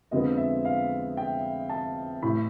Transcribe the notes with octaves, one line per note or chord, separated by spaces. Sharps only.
F2 D3 F3 G#3 B3 D#5
E5
F5
G5
A5
A1 A2 E3 B5